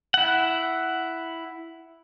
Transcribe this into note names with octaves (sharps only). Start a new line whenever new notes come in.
E4 F#5